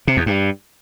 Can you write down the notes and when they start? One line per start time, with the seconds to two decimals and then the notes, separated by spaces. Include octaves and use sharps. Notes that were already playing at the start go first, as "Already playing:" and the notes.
0.07 C3
0.17 E2
0.26 G2